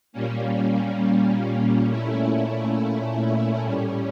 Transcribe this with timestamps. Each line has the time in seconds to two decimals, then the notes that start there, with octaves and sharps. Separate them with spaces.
0.13 A#2 G3 A#3 C#4
1.87 A#2 A3 C#4 E4
3.62 A2 G3 C#4